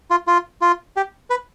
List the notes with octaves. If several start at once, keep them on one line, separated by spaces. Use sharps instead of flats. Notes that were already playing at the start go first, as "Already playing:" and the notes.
F4
F4
F4
G4
B4